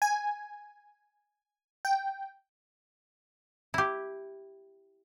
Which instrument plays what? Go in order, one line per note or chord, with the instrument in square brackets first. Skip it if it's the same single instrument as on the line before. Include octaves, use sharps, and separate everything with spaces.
[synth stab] G#5
G5
[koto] E4 G4